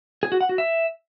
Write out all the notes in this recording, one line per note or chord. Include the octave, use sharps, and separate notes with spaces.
G#4
F#4
F#5
F#4
E5